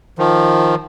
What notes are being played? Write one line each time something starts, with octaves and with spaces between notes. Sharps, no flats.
D#3 F3